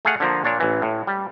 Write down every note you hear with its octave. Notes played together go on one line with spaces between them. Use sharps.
A3 G#4 F5 F#5
D3 F3 A#3
A#2 D4 C#5
A1 E3
A2
G3